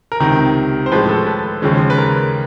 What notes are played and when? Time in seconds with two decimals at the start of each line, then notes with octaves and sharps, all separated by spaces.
0.12 A#4
0.20 C#2 C3 D#3
0.86 C5
0.92 A2 F3 G#3 B4
1.09 A4
1.27 B4
1.62 D#2 C#3 F3 G#3
1.90 B4
1.98 A#4